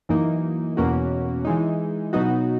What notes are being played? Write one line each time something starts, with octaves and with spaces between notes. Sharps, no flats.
F#2 E3 A#3 D#4
E2 B2 A#3 C#4 F#4
E3 G#3 D#4
B2 F#3 B3 D#4 F#4